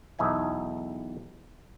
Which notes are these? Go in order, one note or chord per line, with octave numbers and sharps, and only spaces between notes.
B1 E2 D#4 E5 G#5